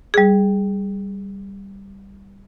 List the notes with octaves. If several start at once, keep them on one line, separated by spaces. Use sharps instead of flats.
G3 G#4